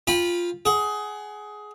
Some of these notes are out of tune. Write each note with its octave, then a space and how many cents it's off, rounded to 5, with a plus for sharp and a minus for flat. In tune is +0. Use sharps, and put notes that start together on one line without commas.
F4 +0 G5 +25 B5 -15
G#4 +15 F#5 +35